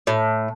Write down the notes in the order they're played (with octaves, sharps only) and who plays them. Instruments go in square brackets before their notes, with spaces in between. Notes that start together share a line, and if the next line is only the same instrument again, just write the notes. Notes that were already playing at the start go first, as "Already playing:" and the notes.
[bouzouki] A2